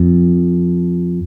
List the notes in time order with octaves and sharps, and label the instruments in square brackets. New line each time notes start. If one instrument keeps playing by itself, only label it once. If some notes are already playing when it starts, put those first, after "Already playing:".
Already playing: [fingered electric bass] F2